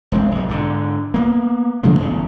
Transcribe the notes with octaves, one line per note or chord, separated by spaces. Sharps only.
E1 G#3 C4
B1 G2
G#2 D3
A#3 B3
C#3 F3 G#3 A#3
G1 E2 C#3